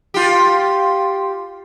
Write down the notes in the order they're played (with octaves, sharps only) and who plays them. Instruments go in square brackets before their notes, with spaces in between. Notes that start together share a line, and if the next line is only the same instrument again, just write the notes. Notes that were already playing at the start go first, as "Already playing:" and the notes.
[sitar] F4 G4